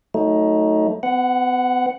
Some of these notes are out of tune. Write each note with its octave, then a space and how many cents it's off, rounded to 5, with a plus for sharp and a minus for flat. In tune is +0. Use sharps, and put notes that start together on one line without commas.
F#3 +0 A3 +0 D#4 +20
B3 +40 F#5 +0